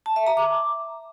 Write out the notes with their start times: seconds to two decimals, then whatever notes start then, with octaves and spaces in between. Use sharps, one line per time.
0.06 A5
0.16 E5
0.27 A#5
0.37 D6